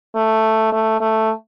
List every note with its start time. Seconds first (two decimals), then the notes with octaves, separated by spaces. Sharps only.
0.15 A3
0.72 A3
1.01 A3